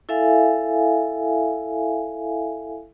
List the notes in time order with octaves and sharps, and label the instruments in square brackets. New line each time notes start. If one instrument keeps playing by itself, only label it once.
[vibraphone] E4 A4 E5 F5 G#5